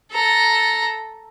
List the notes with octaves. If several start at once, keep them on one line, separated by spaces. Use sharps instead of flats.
A4 A#5